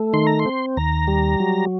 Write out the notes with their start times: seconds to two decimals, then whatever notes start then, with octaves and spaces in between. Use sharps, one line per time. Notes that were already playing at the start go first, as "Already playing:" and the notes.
Already playing: A3
0.13 D#3 C6
0.27 A#5
0.39 C6
0.46 C4
0.77 D#2 A#5
1.08 G3
1.40 F#3